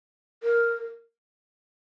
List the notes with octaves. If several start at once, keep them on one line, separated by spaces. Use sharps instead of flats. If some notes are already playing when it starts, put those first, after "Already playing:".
A#4